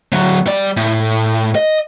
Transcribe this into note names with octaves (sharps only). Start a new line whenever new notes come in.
D2 F#3
G3 D5
A2
D#5